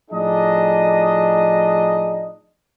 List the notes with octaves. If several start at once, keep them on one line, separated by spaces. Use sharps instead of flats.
A2 F3 D4 D#4 G#4 D#5